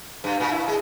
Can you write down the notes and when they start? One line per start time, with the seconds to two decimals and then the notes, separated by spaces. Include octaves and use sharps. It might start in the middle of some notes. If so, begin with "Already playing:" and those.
0.24 G2
0.40 A#2
0.51 E4
0.68 G#3